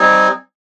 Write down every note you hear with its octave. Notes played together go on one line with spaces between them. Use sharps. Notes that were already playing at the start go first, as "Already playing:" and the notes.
Already playing: G3 C4 D#4 G#5